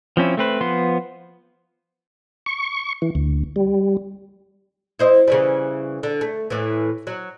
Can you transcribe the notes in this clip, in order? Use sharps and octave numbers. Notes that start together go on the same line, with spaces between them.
F3 C4 C#4 E4
A3 C4 B4
F3 B3 C6
C#6
E3
D2
G3
E4 C5 D#5
C#3 E3 G3
D3
A3
A2 E3
F#3